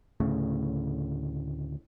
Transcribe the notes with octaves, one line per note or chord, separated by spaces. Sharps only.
D2 A2 C#3